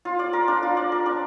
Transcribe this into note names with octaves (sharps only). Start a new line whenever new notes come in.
F4
D5
A#4
D4
F4
D5
A#4
D4